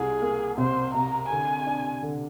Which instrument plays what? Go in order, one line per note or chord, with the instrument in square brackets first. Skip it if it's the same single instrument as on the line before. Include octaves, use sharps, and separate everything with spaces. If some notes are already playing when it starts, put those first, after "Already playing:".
Already playing: [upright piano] C2 [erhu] G#4
[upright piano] A#3
[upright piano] C3 [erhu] C5
[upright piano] C3 [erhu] A#5
[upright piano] D3 [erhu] G#5
[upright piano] D4
D3